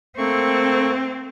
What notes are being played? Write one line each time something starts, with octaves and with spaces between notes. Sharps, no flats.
A3 A#3 C4 C#6